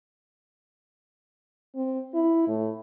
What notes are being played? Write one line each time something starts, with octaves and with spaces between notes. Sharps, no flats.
C4
E4
A2